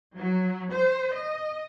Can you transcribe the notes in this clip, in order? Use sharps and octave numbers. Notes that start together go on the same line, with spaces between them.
F#3
C5
D#5